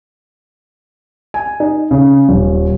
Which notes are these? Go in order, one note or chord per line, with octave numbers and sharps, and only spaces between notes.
G#5
D#4
C#3
D#1